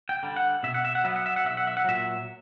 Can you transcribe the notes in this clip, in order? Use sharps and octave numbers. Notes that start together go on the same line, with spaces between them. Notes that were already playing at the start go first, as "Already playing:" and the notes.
G5
D3 G3
F#5
B2 E5
F#5
E5
F#5
F#3 B3 E5
F#5
E5
F#5
B1 E5
F#5
E5
F#5
A#2 F#3 E5